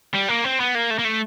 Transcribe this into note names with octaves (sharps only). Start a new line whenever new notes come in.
G3
A#3
C4
B3
A#3
A3
A#3
A3